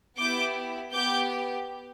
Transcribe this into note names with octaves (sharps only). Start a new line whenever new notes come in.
B3 E4 G4 D6 G6
B3 G4 D6 G6